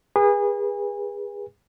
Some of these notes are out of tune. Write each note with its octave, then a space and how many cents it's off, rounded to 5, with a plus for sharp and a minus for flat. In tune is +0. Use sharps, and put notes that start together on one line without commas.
G#4 -30 B4 -30 G#5 -35